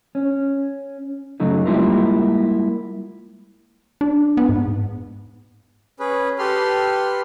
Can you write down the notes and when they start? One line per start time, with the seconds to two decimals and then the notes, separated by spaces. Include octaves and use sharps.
0.15 C#4
1.40 F#2 C#3 F#3 A3 D#4
1.66 G3 G#3 A#3 E4 F4 A#4
4.01 D4
4.37 B3
4.49 G#2
6.00 C#4 G#4 B4
6.39 G4 A4 B4 C6 F6